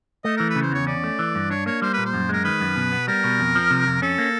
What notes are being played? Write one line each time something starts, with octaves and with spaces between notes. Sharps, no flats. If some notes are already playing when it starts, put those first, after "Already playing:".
A3 D#5
E3 A#4
B4
C#3
C5
E2 C#5
C#4 D5
A3
E3
G2
D4 C#5
A#3 C#5
G3 C5
A#2 B4
C5
F#2
G#3 A#4
D#3 B4
F#2
B2
B3
G3 A#4
B2
F2
F3
C3
F2
C#4 A4
A#3